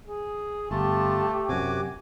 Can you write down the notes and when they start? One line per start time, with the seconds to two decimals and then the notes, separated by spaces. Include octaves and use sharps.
0.08 G#4
0.71 G1 A3 F4 G4 A5
1.49 F#2 C3 F#4 G#5 D6